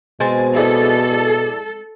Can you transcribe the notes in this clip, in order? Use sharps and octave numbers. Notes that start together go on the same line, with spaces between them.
B2 G#3 C4 G#5 A6
E4 G#4 A4 D5